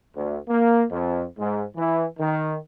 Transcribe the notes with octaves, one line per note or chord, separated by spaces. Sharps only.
D2
A#3
F2
G#2
E3
D#3